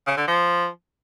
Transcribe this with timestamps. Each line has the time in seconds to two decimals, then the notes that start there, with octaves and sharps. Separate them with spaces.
0.07 C#3
0.17 D3
0.28 F3